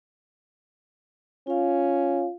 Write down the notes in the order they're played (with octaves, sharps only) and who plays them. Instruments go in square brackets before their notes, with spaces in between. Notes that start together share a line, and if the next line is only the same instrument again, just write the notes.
[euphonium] C#4 [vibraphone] F4 F5